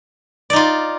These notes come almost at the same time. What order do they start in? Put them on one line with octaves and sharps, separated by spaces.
D5 D#4 F4